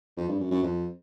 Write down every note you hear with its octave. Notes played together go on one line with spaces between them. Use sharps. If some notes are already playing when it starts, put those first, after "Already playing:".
F2
G2
F#2
F#2
F2